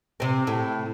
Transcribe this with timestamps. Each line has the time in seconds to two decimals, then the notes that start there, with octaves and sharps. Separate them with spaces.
0.20 C3 C4
0.47 A2